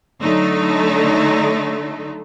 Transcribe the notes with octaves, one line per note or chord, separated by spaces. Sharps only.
D3 F#3 A3 D#4